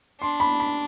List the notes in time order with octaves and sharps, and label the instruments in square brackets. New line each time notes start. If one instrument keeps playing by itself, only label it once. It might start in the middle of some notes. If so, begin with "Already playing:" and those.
[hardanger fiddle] D4 [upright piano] C6
[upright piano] B5
B5